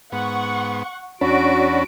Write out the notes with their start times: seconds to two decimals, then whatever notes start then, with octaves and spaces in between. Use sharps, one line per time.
0.12 G#2 B3 F#5 C#6
1.21 E2 C#4 D4 F#4 A5 B5 D7